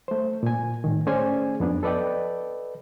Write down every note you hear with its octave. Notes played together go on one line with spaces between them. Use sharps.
A3 C5
A#2 G#5
A2 D#3
A3 C#4 G#4 C5 D5 G#5
F2 B3 D4
A4 B4 D5 D#5 G5